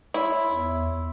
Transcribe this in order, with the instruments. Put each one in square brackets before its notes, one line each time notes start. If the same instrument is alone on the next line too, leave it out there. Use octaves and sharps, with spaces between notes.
[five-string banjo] E4 [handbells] C#5 E5 C6
[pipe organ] E2